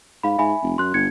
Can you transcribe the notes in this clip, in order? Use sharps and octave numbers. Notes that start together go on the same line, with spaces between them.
G#2 F5 B5
G#2 E5 G#5 B5
F1
F#2 C6 F#6
G1 G#6 C#7